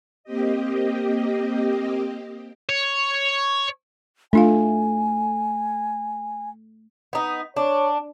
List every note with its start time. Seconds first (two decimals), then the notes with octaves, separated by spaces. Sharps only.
0.24 A#3 C4 G4 D#5
2.69 C#5
4.33 A3 D4 F4 F5 G#5
7.13 B3 D#4
7.56 D4 C#5